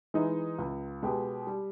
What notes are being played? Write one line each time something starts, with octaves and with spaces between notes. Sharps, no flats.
E3 G#3 D#4
C#2
B2 G#3 B3 G4
G3